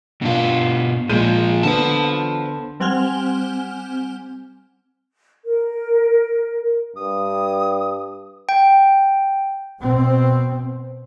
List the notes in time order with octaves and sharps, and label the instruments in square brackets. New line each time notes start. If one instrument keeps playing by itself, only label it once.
[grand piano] G2 [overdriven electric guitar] B2 F4
[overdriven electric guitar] A#2 F3 [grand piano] G#3 G6 D#7
[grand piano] D3 B3 [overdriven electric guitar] C5 A5
[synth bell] G3 C4 F#5 G#5 F6 G7
[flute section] A#4
[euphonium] G2 [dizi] D#6
[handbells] G5
[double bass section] B2 C4